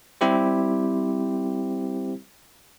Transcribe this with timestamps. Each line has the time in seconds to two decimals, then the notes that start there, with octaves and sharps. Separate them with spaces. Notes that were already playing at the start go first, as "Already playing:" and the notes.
0.21 G3 C4 E4 G4 C5